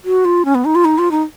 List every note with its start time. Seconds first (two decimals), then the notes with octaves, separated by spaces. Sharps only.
0.05 F#4
0.25 F4
0.45 C#4
0.55 B3
0.65 D#4
0.75 F4
0.85 D#4
0.98 F4
1.11 D#4